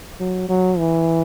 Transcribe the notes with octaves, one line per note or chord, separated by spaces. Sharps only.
F#3
F#3
E3